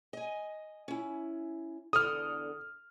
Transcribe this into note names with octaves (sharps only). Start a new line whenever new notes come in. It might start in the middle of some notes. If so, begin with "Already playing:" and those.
D#5 G#5
C#4 E4
E2 D3 A4 D#6 F6